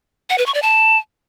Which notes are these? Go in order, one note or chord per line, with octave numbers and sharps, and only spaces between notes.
F#5
B4
C#6
D5
A5